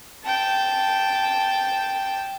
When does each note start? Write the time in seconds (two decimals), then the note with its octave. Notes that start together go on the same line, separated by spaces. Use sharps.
0.25 G5 A5